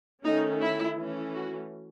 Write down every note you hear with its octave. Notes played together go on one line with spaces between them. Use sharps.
D#3 A3 C#4 D#4
E4
E3 A3 C#4
F#4